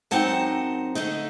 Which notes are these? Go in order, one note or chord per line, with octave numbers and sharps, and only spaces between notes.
F#2 F#3 C4 D#4 F#5 A5
D3 A3 D#4